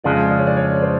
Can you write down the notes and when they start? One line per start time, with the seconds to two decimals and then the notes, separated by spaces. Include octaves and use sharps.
0.04 F2 C#3 F3 G#3 D5
0.31 D5
0.39 C#5
0.47 D5
0.57 C#5
0.82 C5